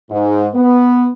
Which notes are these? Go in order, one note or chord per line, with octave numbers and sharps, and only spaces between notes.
G#2
B3